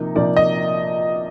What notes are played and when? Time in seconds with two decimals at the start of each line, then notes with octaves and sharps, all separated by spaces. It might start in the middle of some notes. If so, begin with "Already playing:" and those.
Already playing: C3 F3 A#3 D#4
0.15 C3 F3 A#3 D#4 D5
0.36 D#5